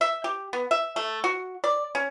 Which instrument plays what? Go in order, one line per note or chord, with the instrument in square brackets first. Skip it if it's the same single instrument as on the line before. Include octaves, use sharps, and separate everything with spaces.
[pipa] E5
G4
B3
E5
A3
F#4
D5
C#4